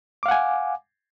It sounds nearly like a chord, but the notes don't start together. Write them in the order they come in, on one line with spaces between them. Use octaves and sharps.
D6 F5 F#5 G#5